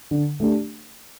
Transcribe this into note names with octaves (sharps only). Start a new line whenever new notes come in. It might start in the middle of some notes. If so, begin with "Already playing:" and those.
D3
A3 D4 G4